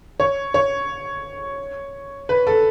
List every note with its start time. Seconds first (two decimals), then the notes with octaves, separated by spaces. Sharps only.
0.20 C#5
0.54 C#5
2.29 B4
2.47 A4